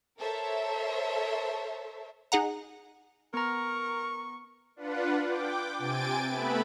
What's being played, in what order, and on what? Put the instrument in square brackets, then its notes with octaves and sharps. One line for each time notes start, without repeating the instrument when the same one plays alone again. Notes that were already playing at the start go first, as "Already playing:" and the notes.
[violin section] A4 A#4 C5 C#5 E5
[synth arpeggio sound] D#4 G#4 F#5 A#5
[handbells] B3 A#5 [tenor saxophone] A#4 [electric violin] C#6
[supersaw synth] D4 F4 B4 F#5
G5 D6
C3 G5 G#5 A6 D7
A3 B3 B4 E5 B5